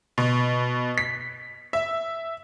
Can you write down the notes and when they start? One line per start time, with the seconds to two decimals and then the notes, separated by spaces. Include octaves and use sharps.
0.18 B2
0.98 B6
1.73 E5